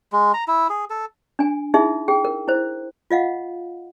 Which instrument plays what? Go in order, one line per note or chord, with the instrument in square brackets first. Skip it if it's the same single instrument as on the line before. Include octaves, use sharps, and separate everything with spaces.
[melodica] G#3
A#5
E4
G#4
A4
[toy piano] D4 G#5
D#4 E4 G#4 E5
G#4 G5
A#4
E4 C5
F4 D#5 F5 F#5